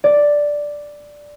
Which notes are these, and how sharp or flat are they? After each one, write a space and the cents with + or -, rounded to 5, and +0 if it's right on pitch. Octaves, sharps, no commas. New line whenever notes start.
D5 +0